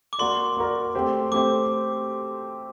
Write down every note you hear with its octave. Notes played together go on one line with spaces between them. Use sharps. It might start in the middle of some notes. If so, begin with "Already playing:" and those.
D6
A#3 F#4 A#4 D5 C6
A#3 F#4 A#4 D5
A3 C4 G4 C5
A3 C4 G4 C5 D6